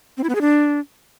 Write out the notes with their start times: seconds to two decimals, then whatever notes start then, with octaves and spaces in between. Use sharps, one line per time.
0.18 C4
0.23 E4
0.29 B3
0.35 G#4
0.41 D4